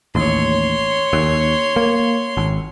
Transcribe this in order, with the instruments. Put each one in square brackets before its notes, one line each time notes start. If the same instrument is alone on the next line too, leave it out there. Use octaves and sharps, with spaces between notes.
[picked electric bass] A1 D#2 [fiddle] C#5 C6
[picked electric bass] D#2
A#3
G#1